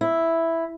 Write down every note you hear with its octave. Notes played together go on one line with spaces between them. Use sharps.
E4